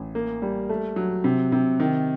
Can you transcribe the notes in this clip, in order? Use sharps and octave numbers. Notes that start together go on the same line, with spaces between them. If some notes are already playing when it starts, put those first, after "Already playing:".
Already playing: A1
A#3
G3
A3
F#3
C3
C3
D#3